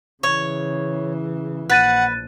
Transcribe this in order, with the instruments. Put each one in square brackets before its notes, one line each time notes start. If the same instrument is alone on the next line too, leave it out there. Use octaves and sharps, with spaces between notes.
[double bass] C#3 E3 [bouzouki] C#5
[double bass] A#1 [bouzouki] B4 [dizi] F#5 [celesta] F#6 A6 D#7